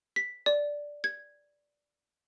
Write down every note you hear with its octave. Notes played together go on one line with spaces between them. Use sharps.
B6
D5
G#6